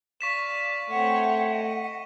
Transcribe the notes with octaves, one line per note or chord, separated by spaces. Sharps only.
D5 F5 C#6 B6 E7
A3 C4 C#5 F#5
D#5